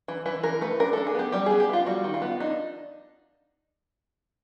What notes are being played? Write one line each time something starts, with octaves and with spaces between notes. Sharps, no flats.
E3
E3 B4
E3 A#4
A3 B4
D4 A#4
D4 A4
G#4
B3 G4
G3 G4
B3 G#4
G4
B3 F4
G3 F#4
D#3
F4
B3
D4 D#4